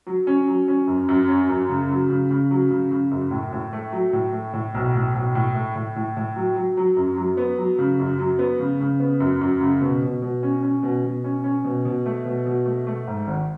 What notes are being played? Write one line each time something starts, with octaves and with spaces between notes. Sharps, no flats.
F#3
C#4
F#3
C#4
F#2
F#2
C#4
F#2
C#3
F#3
C#3
C#3
F#3
C#3
C#3
F#2
A2
A2
A3
F#3
A2
A3
A2
B1
A2
B1
A2
A3
A2
A2
A2
F#3
F#3
F#3
F#2
F#3
B3
F#3
C#3
F#2
F#3
B3
C#3
C#3
B3
F#2
F#2
C#3
B2
B2
B2
C#4
C#4
B2
B2
C#4
C#4
B2
B2
A3
B2
B2
A3
A3
G#2
G#1